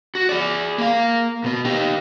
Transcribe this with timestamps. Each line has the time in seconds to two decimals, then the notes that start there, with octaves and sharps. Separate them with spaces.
0.15 F#4
0.29 G#4 D5
0.78 A#3 F5
1.44 B2 B3
1.65 D#4 G4